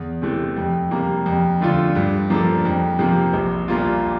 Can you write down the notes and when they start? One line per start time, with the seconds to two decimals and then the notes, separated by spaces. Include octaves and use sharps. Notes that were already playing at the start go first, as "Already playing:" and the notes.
Already playing: E2
0.22 C3 E3 A3
0.56 F2
0.91 C3 G3 A#3
1.26 F2
1.61 D3 A3 D4 F4
1.95 G2
2.30 F3 A#3 D4 A4
2.65 F2
2.99 C3 F3 A#3
3.33 A#1
3.68 A#2 G3 A#3 F4